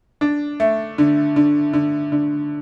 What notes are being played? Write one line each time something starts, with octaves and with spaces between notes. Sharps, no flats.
D4
A3
D3
D3
D3
D3